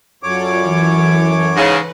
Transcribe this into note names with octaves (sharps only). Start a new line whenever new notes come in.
F#2 F4 A4 C#5 D5 D6
E3 A4
G#2 C#3 B4